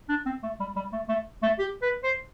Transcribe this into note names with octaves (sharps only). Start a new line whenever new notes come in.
D4
C4
A3
G3
G3
A3
A3
A3
G4
B4
C5